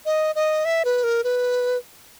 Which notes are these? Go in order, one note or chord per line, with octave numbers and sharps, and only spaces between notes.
D#5
D#5
E5
B4
A#4
B4